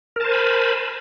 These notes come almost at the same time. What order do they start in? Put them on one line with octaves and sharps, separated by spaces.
A#4 A5 C5 G#5 B5